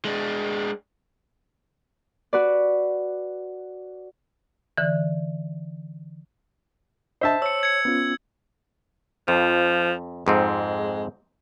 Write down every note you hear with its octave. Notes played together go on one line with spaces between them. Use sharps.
G#3 D4
F#4 B4 D5
D3 E3
D4 C5 D#5 E5 A5
C#5 E6 C#7
G#6 C#7
B3 C#4 F4
F2 F3
F2 G#2 G#3 C4